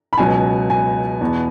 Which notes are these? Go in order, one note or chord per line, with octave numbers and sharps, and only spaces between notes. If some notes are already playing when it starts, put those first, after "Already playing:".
B5
C#2 B2 F#3 B3 G#5
G#5
E2 B2 B3